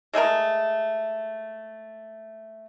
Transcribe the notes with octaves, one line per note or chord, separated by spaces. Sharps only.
G#3 A3 G#4 A#4